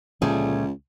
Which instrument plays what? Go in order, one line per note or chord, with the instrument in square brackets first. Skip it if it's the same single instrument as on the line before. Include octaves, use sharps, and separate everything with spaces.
[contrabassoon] C#2 [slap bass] A#2 D3 F3 [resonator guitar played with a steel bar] G3 A3 G#4